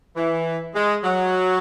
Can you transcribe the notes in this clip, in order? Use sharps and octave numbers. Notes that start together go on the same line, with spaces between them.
E3
G#3
F#3